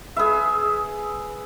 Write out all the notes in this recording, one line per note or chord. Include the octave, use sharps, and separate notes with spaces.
G#4 B4 E5